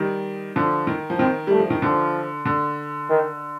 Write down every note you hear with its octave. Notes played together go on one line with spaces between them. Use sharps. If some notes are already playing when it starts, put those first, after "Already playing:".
Already playing: D#3 G3
D3 F3
D#3
F3
D#3 C4
G3 A3
F3
D#3
D3 F3
D3
D#3